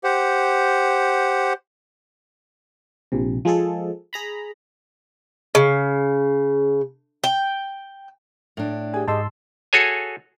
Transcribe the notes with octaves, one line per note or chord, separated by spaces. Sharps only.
G4 C5 F#5
A#1 C3
F3 G#3 G#4 A4
G#4 A#5 B5
C#3
G5
A2 D4
G4 G#4 G#5
G#2 G4 G#4 D#5 A5 C6 E6
F#4 G#4 A4 C#5 G#5